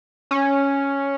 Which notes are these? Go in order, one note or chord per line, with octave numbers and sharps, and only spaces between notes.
C#4